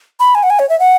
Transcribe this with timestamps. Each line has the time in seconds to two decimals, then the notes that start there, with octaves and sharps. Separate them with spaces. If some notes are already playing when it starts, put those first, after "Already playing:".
0.20 B5
0.35 G#5
0.43 F#5
0.50 G#5
0.59 C#5
0.69 E5
0.80 F#5